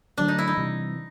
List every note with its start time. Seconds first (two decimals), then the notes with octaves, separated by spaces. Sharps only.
0.17 D3 F#3 A3 D4
0.28 D#4
0.38 E4
0.47 D#4
0.58 C3 E3 G3